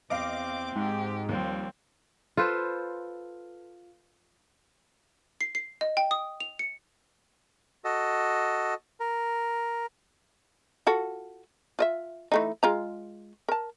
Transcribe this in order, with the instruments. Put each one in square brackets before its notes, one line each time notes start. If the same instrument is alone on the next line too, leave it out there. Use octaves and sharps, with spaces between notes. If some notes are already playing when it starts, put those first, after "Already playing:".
[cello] E2 [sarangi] C4 [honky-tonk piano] D#5 F5 [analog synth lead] D6
[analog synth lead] G#2 [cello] G4
[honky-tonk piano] D#2 [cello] F3 G3 [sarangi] C4
[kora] F4 A4 B4 C5
[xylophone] C7
C7
D#5
G5
D#6
F7
C#7
[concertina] F#4 A4 D#5
A#4
[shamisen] F4 F#4 A4
F4 D#5 E5
E3 A3 D#4
G#3 F4 A#5
A#4 A5